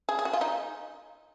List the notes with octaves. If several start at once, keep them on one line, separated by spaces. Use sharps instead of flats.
G#4
G#4
F#4
F4
D#4